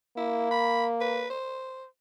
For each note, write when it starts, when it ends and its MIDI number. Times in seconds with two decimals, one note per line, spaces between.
0.17 1.28 58
0.17 0.50 64
0.51 0.85 83
1.01 1.28 71
1.30 1.85 72